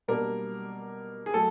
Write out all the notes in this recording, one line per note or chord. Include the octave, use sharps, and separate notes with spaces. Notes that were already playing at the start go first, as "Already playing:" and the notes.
B2 G3 A#3 D4 A#4
G#4
F#3 A3 A4